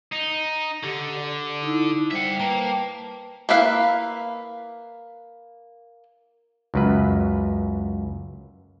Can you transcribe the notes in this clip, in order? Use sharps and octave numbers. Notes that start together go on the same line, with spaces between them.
D#4
D3 G4
D5
D#4 E4
G3 C5 E5 F#5 G5
A#3 B4 G5 A5
A#3 E4 B4 F5
C#2 F#2 B4